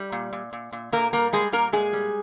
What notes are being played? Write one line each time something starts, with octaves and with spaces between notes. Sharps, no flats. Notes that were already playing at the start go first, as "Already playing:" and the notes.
Already playing: G3
A#2
A#2
A#2
A#2
A#2 A#3 A#4
G3 A#3 A#4
G3 G#3 G#4
A#2 A#3 A#4
A#2 G#3 G#4
G3